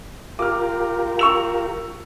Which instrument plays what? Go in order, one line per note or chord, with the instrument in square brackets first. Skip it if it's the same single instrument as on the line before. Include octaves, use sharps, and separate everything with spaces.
[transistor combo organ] F4 G4 A#4 [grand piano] D6 F6
[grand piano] C#6 E6 F7